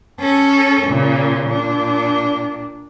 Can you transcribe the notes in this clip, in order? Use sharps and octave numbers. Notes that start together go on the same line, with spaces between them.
C#4 A4
A#2 C#3
A#2 D4